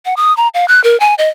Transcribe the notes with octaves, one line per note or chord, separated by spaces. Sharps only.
F#5
D#6
A#5
F5
F#6
A#4
G#5
D#5